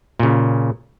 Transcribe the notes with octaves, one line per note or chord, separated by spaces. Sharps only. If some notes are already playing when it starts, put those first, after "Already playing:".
A#2 C#3